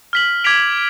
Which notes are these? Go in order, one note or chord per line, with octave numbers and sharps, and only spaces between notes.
F6 B6 F#7
D6 G#6 B6 D7 F7